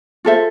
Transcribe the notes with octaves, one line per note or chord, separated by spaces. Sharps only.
F4 A4 C5 E5